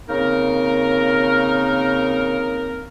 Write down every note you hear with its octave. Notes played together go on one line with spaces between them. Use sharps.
C#3 A#3 C4 D#4 A#4